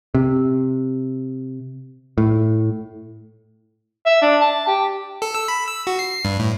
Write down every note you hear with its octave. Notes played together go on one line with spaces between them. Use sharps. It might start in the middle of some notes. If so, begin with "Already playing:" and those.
C3
A2
E5
D4
A5
G4
A4
E6
B5
E6
F#4
C7
G2
A2